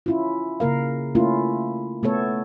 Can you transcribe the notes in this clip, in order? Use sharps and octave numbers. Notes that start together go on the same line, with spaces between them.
C#4 E4 F4
C#3 A#3 A#4 F5
A3 A#3 C#4 E4 F4
A3 B3 A4 C#5